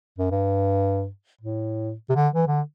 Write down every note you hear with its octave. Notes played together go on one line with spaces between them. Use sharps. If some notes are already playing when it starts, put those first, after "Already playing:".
F#2
G2
A2
C3
D3
E3
D3